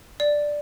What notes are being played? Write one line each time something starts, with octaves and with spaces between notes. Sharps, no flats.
D5